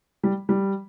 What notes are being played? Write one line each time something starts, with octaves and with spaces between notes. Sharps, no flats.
G3
G3